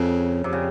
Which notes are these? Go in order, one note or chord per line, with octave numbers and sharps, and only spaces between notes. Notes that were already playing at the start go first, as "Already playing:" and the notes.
Already playing: F2 C#3
F2 C3
C#3